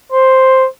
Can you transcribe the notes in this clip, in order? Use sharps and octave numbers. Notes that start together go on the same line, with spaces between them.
C5